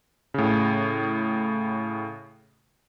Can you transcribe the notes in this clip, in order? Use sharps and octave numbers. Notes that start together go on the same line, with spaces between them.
A2 C#3